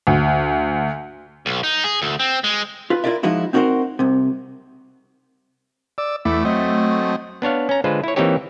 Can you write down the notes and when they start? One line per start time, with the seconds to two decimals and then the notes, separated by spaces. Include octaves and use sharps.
0.07 D2
1.46 B1
1.63 D#4
1.84 G#4
2.02 D2
2.19 C4
2.44 G#3
2.90 F4 B4
3.04 E4 F4 A#4 D5 E5
3.23 F3 G#3 D#4 E4 F#4
3.53 C4 D#4 F#4 G#4 A#4 C5
3.99 C2 C3
5.98 D5 E6
6.25 E2 A3 E4 D6
6.45 F#3 C4 D#5
7.42 B3 D4 C#5 F5
7.69 C#4 A#5
7.84 D3 G#3 F4 B4 C5
8.04 E4 C#5
8.16 E3 A#3 C4 D#4 G4 C#5